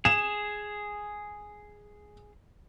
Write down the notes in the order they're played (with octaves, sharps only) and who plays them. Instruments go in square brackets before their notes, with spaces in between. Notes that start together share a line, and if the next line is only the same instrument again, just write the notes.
[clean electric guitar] G#4 [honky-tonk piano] E7